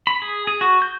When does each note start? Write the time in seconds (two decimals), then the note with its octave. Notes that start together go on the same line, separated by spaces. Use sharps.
0.07 B5
0.22 G#4
0.47 G#4
0.61 F#4
0.82 G6